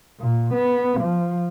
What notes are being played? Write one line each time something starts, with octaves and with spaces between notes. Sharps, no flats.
A#2
B3
F3